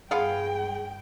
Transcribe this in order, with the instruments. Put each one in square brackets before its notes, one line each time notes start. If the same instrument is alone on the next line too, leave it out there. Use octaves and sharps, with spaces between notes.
[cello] G2 G5 [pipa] B3 F4 F5 [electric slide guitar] G#4